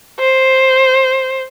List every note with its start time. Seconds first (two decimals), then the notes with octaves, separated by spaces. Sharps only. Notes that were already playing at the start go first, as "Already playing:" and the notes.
0.20 C5